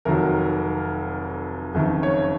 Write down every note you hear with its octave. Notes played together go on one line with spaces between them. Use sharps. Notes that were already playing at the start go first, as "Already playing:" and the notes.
F1 F2 D#3 F#3 A#4
F#1 F2 D#3
C#5